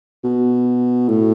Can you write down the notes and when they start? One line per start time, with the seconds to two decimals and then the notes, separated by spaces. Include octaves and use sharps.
0.24 B2
1.09 A2